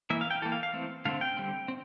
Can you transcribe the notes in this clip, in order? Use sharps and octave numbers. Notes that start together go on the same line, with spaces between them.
E3 A#3 E5
F5
G5
E3 A#3 A4
F5
F5
E3 A3 C4
D3 A3 C4 F5
G5
D3 G3 C4
C4